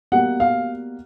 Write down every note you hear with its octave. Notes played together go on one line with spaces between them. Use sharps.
B2 G3 A#3 F#5
F5